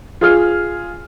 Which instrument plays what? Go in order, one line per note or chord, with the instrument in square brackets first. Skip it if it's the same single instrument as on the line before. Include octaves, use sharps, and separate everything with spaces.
[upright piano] F4 G#4 F6